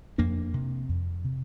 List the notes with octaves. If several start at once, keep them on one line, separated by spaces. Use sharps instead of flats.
F2 A#3 D4
C3
F2
C3